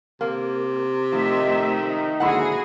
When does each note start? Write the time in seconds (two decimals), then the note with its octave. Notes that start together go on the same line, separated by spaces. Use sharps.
0.21 C3 A#3
1.12 D#3 F3 A3 D#4 E5
2.20 G#2 D3 A#3 E4 F#4 G#4 F#5